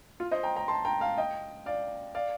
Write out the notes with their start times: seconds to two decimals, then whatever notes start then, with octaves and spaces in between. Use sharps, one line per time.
0.20 F4
0.31 C5 D#5
0.43 G5 A#5
0.56 G5 A#5
0.68 A5 C6
0.85 G5 A#5
1.00 F5 A5
1.17 D#5 G5
1.66 D5 F5
2.15 D5 F5